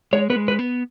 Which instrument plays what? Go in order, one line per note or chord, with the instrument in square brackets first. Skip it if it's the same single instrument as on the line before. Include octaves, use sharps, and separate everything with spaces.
[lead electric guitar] G#3 [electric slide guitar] C#5
[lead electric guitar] B3 [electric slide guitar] B4
[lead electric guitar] G#3
[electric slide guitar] B4
[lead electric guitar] B3